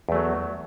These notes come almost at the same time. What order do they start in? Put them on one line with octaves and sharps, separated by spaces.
E2 A3 F#3